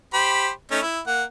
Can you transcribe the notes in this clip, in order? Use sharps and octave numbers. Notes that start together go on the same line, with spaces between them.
G4 C5 B5
A3 C#4 D#4
E4
A#3 F#5